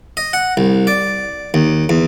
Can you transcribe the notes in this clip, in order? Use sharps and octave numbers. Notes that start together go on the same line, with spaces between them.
D#5
F#5
C2
D5
D#2
E2